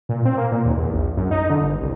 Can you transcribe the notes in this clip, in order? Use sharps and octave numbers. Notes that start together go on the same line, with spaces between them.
A#2
C4
A#3
A#2
D#2
E2
A#1
F#2
D#4
D3
G1
C2